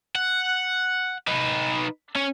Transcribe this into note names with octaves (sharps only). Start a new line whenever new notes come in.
F#5
D#4 B4
C#4